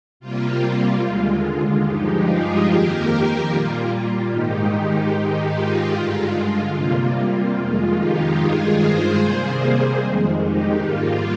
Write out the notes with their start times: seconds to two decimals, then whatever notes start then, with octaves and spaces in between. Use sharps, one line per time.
0.20 C3 G3 A#3 F4
0.61 F4
1.02 D#2 D3 G#3 F4
1.83 G2 F3 G#3 D#4 G4
2.24 F4 G#4
2.66 F2 D#3 A#3 G4 A#4
3.47 A#2 G3 A#3 F4
4.29 G#2 D#3 G#3 D#4 G4
5.10 G#2 D#3 G#3 D#4 G4
5.51 F4
5.92 G2 D3 G#3 F4
6.74 C3 G3 A#3 F4
7.15 F4
7.56 F2 D#3 G#3
7.96 D#4 G4
8.37 G2 D#3 G#3 F4 G#4
8.78 G#4 C5
9.19 C3 G3 A#3
10.01 F2 D#3 G#3
10.42 D#4 G4
10.82 G#2 G3 A#3 F4